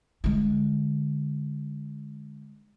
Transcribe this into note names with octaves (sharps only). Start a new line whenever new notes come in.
D3 G#3